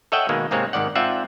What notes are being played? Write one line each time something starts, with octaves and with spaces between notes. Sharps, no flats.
A4 C#5 D#5 E5 F#5 G5
B2 D#3 G#3 A#3
G#2 C3 G#3 A#3 C4 C#5
G#1 G#2 D#3 D5 F#5
G#2 C4 F4 D5 E5 F#5